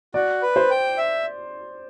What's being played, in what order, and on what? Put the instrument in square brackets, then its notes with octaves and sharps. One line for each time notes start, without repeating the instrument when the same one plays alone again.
[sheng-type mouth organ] F#4 [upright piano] D5
[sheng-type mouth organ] B4
[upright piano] C5
[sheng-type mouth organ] G5
E5